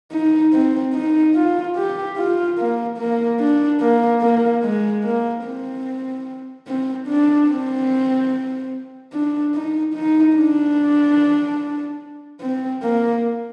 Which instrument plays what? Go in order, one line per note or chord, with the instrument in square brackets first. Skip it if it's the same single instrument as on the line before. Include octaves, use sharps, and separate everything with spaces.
[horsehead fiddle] D#4
C4
D#4
F4
G4
F4
A#3
A#3
D4
A#3
A#3
G#3
A#3
C4
C4
D4
C4
D4
D#4
D#4
D4
C4
A#3